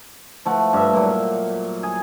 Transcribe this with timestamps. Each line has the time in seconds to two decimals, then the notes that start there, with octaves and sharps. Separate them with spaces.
0.45 F3 A3 F#5
0.73 G2 E5
0.93 A#2 F#3
1.83 G#4